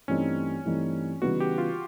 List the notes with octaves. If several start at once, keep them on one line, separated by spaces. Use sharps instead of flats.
G2 E3 A3 C4 C#4 D#4
G2 E3 A3 C4 D#4
C#3 E3 G3 B3 D#4 F#4
G4
F4